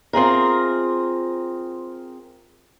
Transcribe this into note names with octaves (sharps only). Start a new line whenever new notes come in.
C4 F4 G#4 A#4